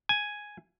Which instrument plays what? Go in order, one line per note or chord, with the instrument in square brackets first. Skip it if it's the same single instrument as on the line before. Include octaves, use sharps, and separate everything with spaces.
[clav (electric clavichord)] G#5